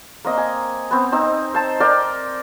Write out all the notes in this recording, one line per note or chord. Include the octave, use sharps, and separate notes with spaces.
A#3 C4 D#5
G#5
B3 C4
C4 D#4 A#5
C5 A5
A#4 D5 G5